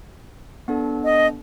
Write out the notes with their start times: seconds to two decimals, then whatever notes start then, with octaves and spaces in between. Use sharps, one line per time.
0.68 B3 D4 A4
1.04 D#5